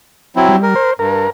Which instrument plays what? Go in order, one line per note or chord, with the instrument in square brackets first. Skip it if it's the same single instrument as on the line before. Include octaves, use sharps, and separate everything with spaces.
[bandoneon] F#3 C4 E4
[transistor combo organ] G3
[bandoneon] A#4
[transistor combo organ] C5
[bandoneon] G2 [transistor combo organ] A#4